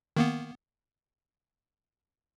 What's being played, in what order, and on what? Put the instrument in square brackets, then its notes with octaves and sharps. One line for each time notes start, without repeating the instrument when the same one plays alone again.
[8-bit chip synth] D#3 A#3 B3